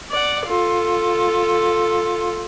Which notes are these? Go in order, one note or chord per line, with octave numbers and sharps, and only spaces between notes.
D5 F#5
F4 A4